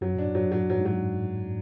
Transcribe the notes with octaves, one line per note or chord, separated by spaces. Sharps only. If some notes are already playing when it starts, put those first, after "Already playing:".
F#2 F#3
A2 D4
G#2
F#3
A2 F#3
F#3
G#2
F#3